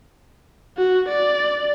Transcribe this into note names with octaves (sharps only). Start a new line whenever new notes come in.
F#4
D5